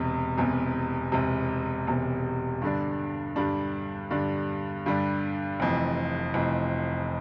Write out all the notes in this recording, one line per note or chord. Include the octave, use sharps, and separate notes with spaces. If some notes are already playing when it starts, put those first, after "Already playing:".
Already playing: E1 E2 C3
E1 E2 C3
E1 E2 C3
E1 E2 C3
G2 D3 G3 D4
G2 D3 G3 D4
G2 D3 G3 D4
G2 D3 G3 D4
F1 F2 E3
F1 F2 E3